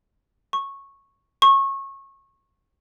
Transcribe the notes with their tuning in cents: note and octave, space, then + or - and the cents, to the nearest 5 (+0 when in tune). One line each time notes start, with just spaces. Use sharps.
C#6 -10
C#6 -25